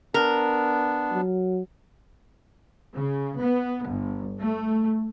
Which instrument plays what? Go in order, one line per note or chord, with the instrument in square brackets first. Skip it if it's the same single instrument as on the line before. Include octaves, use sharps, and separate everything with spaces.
[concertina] B3 D4 [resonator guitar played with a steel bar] A#4
[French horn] F#3
[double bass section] C#3
B3
G1
A3